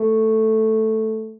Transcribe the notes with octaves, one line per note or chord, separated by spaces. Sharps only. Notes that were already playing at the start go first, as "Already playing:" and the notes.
Already playing: A3